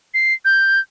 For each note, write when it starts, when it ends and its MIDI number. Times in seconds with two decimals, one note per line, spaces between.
0.14 0.34 96
0.45 0.80 91